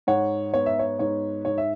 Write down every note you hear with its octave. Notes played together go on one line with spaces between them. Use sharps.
G#2 C#5 F#5
B3 C#5
E5
C#5
G#2 C#5
G#2 C#5
E5